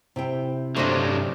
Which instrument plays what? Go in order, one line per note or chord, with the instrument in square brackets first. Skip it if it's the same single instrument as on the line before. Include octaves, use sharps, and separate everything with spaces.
[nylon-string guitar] C3 E4 G5
[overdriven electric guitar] G2 F#3 [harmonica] A3 D4 [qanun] C5 D#5